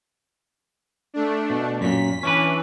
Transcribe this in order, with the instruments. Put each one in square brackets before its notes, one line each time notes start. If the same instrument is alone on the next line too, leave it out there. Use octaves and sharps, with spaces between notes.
[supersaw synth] A3 D4
[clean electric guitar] B2
[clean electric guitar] F#2 A#2 [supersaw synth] B6
[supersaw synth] E3 [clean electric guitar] C#4 D4 B4